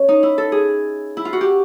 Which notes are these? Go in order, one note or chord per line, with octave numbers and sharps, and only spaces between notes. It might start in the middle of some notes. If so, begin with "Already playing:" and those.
Already playing: C#4
D#4
E4
A4
G#4
E4
F4
F#4
G4